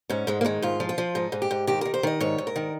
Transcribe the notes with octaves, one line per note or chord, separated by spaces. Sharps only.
G#2 C#4
G#2 G#3
A#3
D#3 G#3
G#2 F4
F3
F4
F3
G#2 D#4
G#2
G4
G#2
D#3 G4
D#3 A#4
C5
D#3 D#5
G#2 C#5
G#2
A#4
D#3